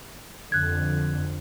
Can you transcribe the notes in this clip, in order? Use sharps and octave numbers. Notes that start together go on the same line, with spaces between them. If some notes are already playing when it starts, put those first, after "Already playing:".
F2 D3 F#6 G#6